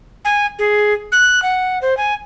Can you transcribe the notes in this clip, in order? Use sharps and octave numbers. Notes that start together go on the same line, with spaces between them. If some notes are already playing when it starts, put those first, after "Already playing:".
G#5
G#4
F#6
F#5
C5
G#5